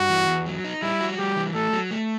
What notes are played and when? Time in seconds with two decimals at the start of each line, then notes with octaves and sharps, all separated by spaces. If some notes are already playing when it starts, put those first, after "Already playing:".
Already playing: G2 F#4
0.10 E3
0.28 E2
0.46 F#3
0.64 D#4
0.82 G3 E4
1.01 F#4
1.18 G3 G4
1.36 E3
1.55 A3 A4
1.73 F#3
1.91 A3